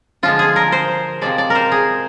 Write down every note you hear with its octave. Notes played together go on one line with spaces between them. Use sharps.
D3 F3 G#3 F4
G#4
A#4
C5
C3 F3 G#3 D5
D5
A#4 C5
G#4